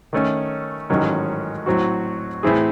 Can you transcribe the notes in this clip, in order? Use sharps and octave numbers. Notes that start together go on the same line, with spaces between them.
D#3 A3 C#4
A1 G#2 D#3 F#3 C#4
A2 F#3 C4 F#4
A2 E3 C4 E4 G#4